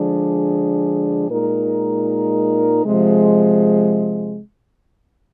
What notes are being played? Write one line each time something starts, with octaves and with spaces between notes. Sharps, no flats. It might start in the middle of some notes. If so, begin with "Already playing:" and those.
Already playing: D3 F3 G#3 D4 G#4
A#2 G#3 D#4 A#4
C3 F3 G#3